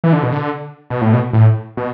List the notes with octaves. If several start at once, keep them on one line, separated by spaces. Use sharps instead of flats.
E3
D3
B2
D3
B2
A2
B2
A2
B2